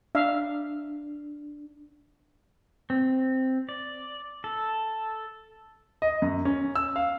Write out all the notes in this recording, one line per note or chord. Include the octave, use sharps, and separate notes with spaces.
D4 E5 F5
C4
D5
A4
D#5
F#2
C#4
E6
F5